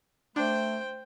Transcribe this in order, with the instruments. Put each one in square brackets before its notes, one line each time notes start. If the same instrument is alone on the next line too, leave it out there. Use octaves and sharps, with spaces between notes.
[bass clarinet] A3 [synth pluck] D4 [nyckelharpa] C5 G5